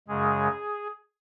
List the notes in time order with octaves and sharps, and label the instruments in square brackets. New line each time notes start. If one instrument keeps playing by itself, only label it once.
[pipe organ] F#2 C#3 G#3 G#4